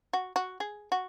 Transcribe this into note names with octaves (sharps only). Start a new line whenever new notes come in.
F#4
F#4
G#4
F#4